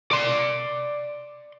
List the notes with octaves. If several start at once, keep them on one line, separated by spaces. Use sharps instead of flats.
D5 C6